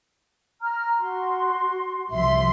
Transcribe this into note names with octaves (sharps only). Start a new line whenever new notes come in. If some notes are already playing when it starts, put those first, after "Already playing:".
A#5 F6
F#4 C6
C2 F3 E5 C6